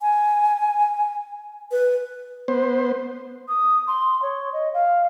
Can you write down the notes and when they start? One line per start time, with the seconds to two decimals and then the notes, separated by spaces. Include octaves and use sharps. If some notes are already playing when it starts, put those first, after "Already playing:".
0.01 G#5
1.71 B4
2.48 B3 C5
3.48 D#6
3.87 C6
4.22 C#5
4.53 D#5
4.74 F5